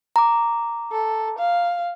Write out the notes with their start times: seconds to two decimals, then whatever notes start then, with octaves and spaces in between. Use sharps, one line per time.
0.16 A#5 D6
0.92 A4
1.38 F5